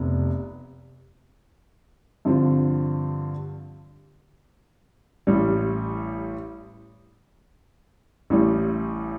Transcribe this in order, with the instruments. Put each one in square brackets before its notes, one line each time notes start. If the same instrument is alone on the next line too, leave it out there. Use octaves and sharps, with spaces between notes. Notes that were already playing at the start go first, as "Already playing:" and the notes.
Already playing: [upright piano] F1 C3 B3
G2 D3 F3 C4 F4
A1 A2 G3
A1 A2 G3